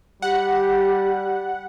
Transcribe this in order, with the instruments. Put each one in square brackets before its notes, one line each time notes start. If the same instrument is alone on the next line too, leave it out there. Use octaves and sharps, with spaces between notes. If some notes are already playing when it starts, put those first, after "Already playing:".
[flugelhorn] G3 [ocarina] G4 [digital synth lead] F#5